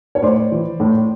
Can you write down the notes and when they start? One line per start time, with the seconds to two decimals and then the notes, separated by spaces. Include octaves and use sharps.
0.15 C#5
0.23 A2 C5 D5
0.52 E3
0.80 A2